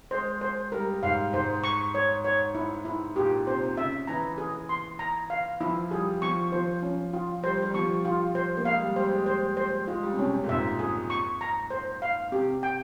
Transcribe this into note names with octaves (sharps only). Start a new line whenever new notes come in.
G#3 C5
C5
G3 A#4
G#2 F5
G#2 C5
C#6
C#5
C#5
E4
E4
A#2 G4
C3 C5
C#3 E5
E3 A#5
G#4
C6
A#5
F5
F3 E4
G3 G#4
F3 C#6
F3 C5
C#4
F4
G3 C5
G3
F3 C#6
F4
C5
A#3
G#3 F5
G3
G3 C5
G#3
C5
C5
G#3 F4
G3
C3
C#3 C#4
C3
A#2
G#2 E5
G#4
C#6
A#5
C5
F5
C3 G4
G5